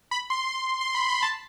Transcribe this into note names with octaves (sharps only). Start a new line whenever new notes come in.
B5
C6
C6
C6
B5
B5
A5